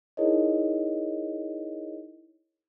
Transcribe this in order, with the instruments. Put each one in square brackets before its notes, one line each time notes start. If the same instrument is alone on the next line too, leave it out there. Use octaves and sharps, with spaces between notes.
[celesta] D#4 E4 G#4 A#4 C#5 D#5